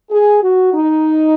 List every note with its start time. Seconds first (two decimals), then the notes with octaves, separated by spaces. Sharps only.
0.11 G#4
0.42 F#4
0.73 D#4